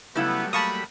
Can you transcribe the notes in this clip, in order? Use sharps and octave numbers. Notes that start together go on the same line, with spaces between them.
C#3 F#3 G3 A3 B3 E4
A#3 A5 B5 C#6 D#6